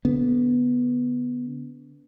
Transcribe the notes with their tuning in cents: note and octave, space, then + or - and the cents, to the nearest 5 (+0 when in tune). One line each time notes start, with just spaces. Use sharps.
D3 -30 B3 +0